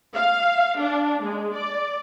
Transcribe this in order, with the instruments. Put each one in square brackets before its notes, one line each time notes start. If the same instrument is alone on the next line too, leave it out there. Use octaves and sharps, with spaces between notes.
[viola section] F5
D4
G#3
D5